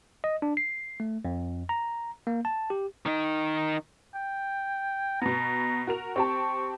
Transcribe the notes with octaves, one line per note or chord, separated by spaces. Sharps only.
D#5
D4
C7
A3
F2
A#5
A#3
A5
G4
D#3 D#4
G5
B2 B3 A#5
F#4 A#4 F7
C4 G4 A5 C#6